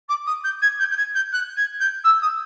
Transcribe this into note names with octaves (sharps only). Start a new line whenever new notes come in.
D6
D#6
G6
G#6
G6
G6
G#6
G6
F#6
G#6
G6
E6
D#6